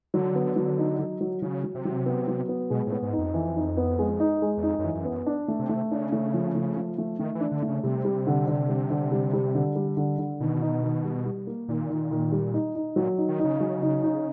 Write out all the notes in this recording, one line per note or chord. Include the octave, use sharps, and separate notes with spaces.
D3 F#3
B3
F#3
D#4
F#3
F#3
C#3 F#3
F#3
C3
F#3
B3
F#3
B3
B2 G#3
A2
B3
G#2
D#4
F2
E3
D#4
B3
G#3
D#4
G#3
E2
F2 D#4
F#2
E3
F#2
B3
F#2
D4
A3
C3
A3
C#3 D4
A3
F3
A3
F3
A3
D#3 A3
E3
D4
D3
C#3 A3
C3 G3
G3
D3
D3
G3
D3
G3
G3
D3
G3
D3
D3
B2 D#3
D#4
D#3
G3
G3
A#3
A#2 D#3
D#3
D#3
G3
D#4
D#4
A#2 F#3
D#4
D#3
C#3 D#4
F#3
D#4
D#4